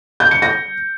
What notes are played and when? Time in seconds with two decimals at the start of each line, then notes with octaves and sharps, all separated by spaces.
0.20 G6
0.31 C#7
0.42 A#6